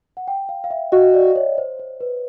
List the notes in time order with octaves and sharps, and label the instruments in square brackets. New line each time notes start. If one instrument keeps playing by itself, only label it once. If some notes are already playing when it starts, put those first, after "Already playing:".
[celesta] F#5
G5
F5
F5
E5
[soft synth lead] F#4 [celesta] D#5
[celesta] D5
C#5
C5
C5
B4